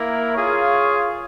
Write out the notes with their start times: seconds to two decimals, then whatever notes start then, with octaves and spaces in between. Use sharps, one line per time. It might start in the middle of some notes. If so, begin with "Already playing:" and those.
Already playing: A#3 E4 A#4
0.35 F4 G#4 C#5 F5